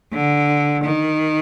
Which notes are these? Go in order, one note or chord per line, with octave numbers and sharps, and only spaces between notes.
D3
D#3